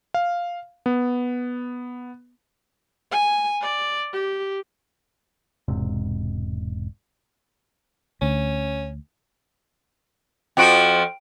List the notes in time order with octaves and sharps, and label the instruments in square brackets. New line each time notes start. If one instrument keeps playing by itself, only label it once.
[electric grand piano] F5
B3
[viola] G#5
D5
G4
[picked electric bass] E1 G#2 C3
[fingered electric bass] D2 [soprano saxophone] C#4
[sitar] F2 F3 F#4 [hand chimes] G5 D7